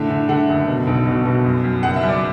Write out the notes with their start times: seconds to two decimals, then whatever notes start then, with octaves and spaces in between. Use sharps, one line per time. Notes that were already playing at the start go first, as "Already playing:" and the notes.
Already playing: A2 D3 E5
0.10 D3
0.29 D3 F#5
0.49 F#1
0.67 B2
0.87 B1
1.06 B2
1.25 B2
1.45 F#2
1.64 F#2
1.83 F#1 F#5
1.96 E5
2.03 F#2
2.09 D5